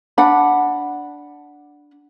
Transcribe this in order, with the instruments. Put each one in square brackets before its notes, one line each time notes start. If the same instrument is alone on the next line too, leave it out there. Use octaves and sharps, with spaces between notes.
[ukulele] D4 F#5 B5